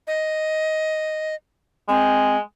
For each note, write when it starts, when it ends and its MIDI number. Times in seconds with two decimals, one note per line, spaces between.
0.07 1.35 75
1.89 2.39 56
1.89 2.36 60